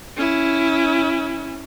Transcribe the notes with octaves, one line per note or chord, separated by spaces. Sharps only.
C#4 E4